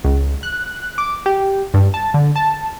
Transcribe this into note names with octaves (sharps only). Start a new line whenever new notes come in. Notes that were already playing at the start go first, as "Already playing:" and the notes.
C#2
F#6
D6
G4
G2
A5
D3
A5